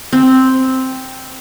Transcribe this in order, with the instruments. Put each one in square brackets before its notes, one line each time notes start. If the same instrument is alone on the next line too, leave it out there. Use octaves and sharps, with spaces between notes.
[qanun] C4